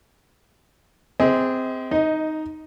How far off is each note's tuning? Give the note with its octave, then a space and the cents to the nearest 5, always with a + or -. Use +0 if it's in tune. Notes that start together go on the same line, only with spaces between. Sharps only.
C4 -15 G#4 -20 D#5 +40
D#4 +0 D#5 +20